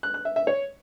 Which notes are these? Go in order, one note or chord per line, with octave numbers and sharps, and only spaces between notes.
F#6
F#6
E5
E5
C#5